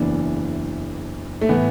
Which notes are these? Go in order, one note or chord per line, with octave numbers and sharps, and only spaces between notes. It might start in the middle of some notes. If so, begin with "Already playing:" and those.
Already playing: F#1 E2 E3 D4
A3
A2 E3 B3